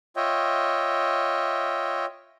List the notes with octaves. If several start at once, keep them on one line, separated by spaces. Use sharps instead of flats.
F4 C#5 D#5 E5 G5